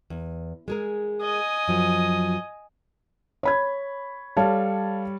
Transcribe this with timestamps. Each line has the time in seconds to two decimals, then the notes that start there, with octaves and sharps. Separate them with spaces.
0.10 E2
0.68 G#3 G#4 A#4
1.22 D#5 G#5
1.68 F#2 F3 F#3
3.43 C#5 B5 G#6
4.37 G3 A4 C#5 F5 A5